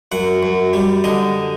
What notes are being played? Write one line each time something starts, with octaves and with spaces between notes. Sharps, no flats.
F#2 F#5
F#2
G3
D3 D#5